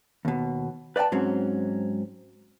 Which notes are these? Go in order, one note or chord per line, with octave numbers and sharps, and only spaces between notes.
D#2 B2
B4 D5 D#5 G5 A5
G#2 F#3 C4 C#4